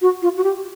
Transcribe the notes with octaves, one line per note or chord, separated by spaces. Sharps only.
F#4
F4
F#4
G4